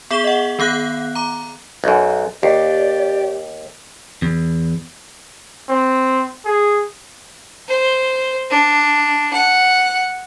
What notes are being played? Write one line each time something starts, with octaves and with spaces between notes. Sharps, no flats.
B3 G#4 C#6 E7 G7
D#5 F#5
D#3 B3 F5 F#6
A#5 D6
B1 F#2
D#2 G4 D5
E2
C4
G#4
C5
D4
F#5